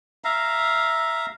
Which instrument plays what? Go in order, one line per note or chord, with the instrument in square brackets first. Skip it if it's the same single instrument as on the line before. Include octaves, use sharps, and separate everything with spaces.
[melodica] E5 F5 A#5